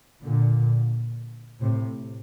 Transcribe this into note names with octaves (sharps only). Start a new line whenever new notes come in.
A#2 D3
A2 C3